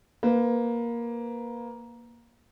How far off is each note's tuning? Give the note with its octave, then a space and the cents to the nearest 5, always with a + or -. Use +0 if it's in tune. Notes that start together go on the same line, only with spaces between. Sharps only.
A#3 +10 B4 +20